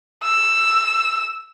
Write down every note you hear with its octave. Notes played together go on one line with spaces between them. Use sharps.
E6